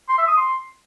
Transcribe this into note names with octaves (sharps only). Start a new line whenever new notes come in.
C6
E5
D#6
C6